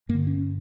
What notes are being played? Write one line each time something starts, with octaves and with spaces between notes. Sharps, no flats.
G2 D3 A#3
C#4